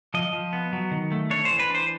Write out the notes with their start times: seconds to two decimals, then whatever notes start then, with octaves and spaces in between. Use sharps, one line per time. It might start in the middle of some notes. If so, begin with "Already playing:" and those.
0.14 F3 D#5
0.33 F3
0.53 B3
0.73 F#3
0.91 D#3
1.12 A3
1.31 D4 C#5
1.45 C5
1.50 E3
1.59 B4
1.70 D4 C5